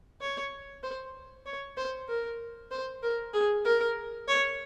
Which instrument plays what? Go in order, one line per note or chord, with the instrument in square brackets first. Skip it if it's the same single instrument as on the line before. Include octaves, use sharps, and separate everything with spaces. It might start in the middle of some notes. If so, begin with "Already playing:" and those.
[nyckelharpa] C#5
C5
C#5
C5
A#4
C5
A#4
G#4
A#4
C#5